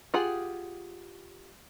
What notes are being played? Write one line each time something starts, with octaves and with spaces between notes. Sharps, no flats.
F4 G4 G#4 F#5